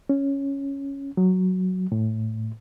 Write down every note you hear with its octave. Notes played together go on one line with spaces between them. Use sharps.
C#4
F#3
A2